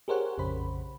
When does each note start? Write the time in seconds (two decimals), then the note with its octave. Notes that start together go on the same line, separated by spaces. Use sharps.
0.08 G4 G#4 A#4 C5 C#5 F#5
0.38 A#1 F2 C#3 C5 B5